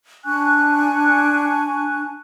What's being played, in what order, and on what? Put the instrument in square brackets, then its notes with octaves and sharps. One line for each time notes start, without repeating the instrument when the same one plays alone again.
[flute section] D4 G#5 C#6 F#6